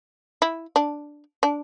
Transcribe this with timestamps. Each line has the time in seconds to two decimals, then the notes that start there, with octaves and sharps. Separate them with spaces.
0.42 E4
0.76 D4
1.43 D4